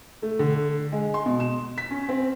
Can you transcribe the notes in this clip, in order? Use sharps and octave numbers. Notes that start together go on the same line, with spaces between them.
A3
D3
G#3
C6
B2
E7
B6
C#4
C4